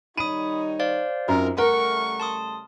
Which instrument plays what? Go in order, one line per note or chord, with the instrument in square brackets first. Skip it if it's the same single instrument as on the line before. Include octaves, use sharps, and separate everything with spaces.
[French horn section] D#3 G3 D#4 [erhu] C#5 [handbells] B5 D#6 [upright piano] D#7
[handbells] C5 D5 F5
[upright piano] F#2 [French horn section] C4 D#4 F4 [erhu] A#4
[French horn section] C#3 G3 A3 [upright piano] A#4 [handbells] F#5 [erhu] C#6
[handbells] A5 C6 D#6